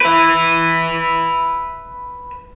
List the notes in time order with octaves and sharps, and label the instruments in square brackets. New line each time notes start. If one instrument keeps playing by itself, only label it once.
[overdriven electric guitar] B4 E5